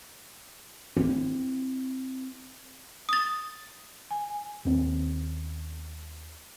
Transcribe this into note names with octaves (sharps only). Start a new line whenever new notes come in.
C4 E4
D#6 A6
G#5
D#2 A#3 C4 C#4